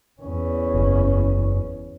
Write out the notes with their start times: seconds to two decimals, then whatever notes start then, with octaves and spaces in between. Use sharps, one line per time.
0.22 E2 C#4
0.74 F#1